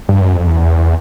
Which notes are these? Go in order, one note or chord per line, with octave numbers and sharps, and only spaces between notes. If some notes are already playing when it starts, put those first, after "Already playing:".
G2
F#2
F2
E2